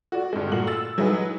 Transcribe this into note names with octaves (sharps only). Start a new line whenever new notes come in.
F#4 D5
G2 D3 G#3
A#2 A3 F#4 F#7
E6 A6
F#3 G#3 D#4 E4 G#4 B4